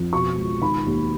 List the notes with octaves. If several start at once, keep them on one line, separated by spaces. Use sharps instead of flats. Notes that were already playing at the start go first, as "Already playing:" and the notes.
Already playing: F2
B2 C#6
C#2
D#3 B5
D#2